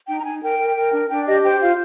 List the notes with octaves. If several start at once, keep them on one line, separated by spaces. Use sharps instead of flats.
D#4 G5
A#5
D#4 G#5
A#4 G5
A#4
A#4
D4
D4 G5
G4 D#5
C5 G5
F4 F5